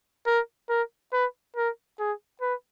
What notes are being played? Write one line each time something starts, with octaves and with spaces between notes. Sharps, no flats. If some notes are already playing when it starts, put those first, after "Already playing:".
A#4
A#4
B4
A#4
G#4
B4